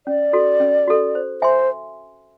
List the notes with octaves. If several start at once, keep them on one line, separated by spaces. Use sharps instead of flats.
C#4 D5
F#4 A4
C#4
F#4 A4
C5
C5 E5 G#5 C6